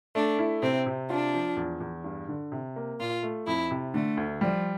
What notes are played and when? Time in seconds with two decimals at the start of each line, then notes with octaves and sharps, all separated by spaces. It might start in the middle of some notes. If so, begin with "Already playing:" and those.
0.15 A3 D4
0.39 E4
0.62 C3 C4
0.86 C3
1.09 D4 F4
1.34 F3
1.57 E2
1.80 E2
2.04 G2
2.29 D3
2.52 C3
2.76 A#3
2.99 A#2 F4
3.23 A3
3.46 F2 E4
3.71 C3
3.94 D3 A3
4.17 D2
4.41 F3 G3